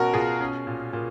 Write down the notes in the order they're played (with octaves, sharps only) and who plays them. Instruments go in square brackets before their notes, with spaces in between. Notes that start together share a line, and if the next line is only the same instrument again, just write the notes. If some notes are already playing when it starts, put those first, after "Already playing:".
Already playing: [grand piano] B2 C#4 F#4 A#4
B2 F4 G#4
C#4
A#2
A#2